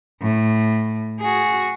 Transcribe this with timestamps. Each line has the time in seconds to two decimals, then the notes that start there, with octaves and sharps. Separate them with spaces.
0.22 A2
1.20 F#4 G#4